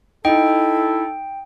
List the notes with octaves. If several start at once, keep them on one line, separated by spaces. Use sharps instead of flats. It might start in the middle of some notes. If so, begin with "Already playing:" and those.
D#4 E4 A4 G5